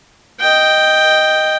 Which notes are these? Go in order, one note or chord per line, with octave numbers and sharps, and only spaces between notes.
D#5 G5